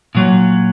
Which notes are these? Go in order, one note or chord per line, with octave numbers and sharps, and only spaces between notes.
A#2 F#3